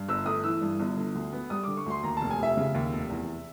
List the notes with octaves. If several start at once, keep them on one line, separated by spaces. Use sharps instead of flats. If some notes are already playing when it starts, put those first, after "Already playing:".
Already playing: G2
G1 E6
A3 D#6
E3 E6
G2
G1
D3
D2
B3
G3 D#6
D3 D6
C#6
D2 C6
D#2 A#5
F1 A5
G#5
F1 E5
C#3
D#2
F1
E2